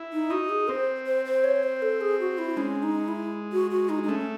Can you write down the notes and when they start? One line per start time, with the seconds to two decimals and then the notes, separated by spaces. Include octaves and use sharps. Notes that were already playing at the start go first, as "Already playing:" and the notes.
Already playing: E4
0.12 D#4
0.30 D#4 F#4
0.49 G#4
0.68 C4 C5
1.06 C5
1.25 C5
1.44 C#5
1.63 C5
1.82 A4
2.01 G#4
2.20 F#4
2.38 E4
2.57 G#3 C#4
2.83 D#4
3.08 E4
3.52 F#4
3.70 F#4
3.89 D#4
4.03 D#4
4.08 A3 C#4